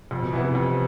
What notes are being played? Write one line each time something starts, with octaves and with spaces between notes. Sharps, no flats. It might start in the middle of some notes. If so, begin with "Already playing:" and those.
F2 C3
B2
C3 E3 B3 E4
C3
F2 C3